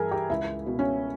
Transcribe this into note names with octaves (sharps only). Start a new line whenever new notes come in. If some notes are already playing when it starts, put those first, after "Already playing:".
Already playing: G2 E3 E4 G#4 A#4
G4
C#2 E4
B2
C#4